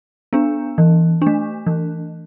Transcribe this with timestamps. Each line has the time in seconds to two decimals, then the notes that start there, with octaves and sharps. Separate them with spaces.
0.33 B3 D4
0.78 E3
1.22 A3 D4
1.67 E3